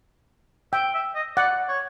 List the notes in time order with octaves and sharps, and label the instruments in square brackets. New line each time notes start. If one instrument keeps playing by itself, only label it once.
[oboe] E5 [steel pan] G5
[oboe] E5
D#5
[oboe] D5 [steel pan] F#5
[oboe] C#5